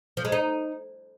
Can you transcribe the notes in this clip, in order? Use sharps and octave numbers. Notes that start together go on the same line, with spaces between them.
F3
G#3
D#4